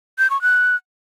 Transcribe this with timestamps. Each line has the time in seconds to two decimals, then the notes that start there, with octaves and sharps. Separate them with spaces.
0.18 G6
0.30 C#6
0.42 F#6